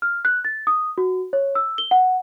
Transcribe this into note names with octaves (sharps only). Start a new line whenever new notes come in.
F6
F#6
A6
D#6
F#4
C#5
E6
G7
F#5